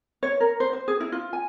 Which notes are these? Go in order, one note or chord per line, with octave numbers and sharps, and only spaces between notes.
C#5
A#4
C5
C5
G#4
E4
F4
G#5